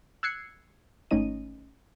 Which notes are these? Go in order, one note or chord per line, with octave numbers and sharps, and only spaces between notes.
E6 F#6 G#6 C7 C#7
G#1 A3 C#4 D#4 D#5 D#7